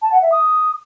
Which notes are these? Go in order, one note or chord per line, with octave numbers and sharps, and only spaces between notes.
A5
F#5
E5
D#6